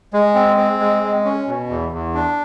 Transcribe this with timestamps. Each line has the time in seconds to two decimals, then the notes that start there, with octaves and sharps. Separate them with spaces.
0.13 G#3
0.35 C4
0.57 C4
0.80 G#3
1.03 G#3
1.24 C#4
1.48 B2
1.69 E2
1.92 E2
2.15 D4